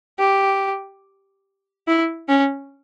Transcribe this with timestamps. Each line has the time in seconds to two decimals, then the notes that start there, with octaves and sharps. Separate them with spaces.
0.19 G4
1.88 E4
2.29 C#4